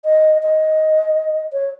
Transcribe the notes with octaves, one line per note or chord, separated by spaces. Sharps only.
D#5
D#5
C#5